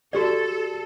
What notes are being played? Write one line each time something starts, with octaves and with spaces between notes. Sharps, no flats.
F#4 G4 A4 D5